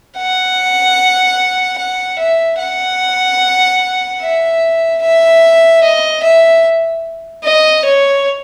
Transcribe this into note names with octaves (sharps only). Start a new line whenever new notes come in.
F#5
F#5
E5
F#5
E5
E5
D#5
E5
D#5
C#5